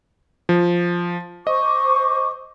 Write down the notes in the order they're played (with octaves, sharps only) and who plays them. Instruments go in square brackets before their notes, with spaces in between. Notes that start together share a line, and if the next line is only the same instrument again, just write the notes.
[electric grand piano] F3
[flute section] C5 C#6 D6 [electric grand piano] D#5